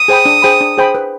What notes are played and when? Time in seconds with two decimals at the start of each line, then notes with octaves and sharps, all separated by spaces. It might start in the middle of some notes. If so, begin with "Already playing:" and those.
Already playing: D#6
0.08 G#4 C5 G5 B5
0.25 D4
0.42 G#4 C5 G5 B5
0.61 D4
0.78 G#4 C5 G5 B5
0.95 B4